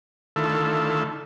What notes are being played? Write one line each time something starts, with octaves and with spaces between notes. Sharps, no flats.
D3 D#3 A3 E4 F4 A4